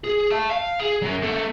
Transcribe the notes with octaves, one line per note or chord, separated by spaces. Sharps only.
G#4
E5 A5
F5
G#4
F#3 A#4
A#3 A4